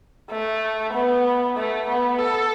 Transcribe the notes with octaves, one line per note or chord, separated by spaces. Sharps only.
A3
B3
A3
B3
A4